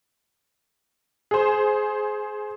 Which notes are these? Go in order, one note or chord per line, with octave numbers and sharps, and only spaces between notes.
G#4 C5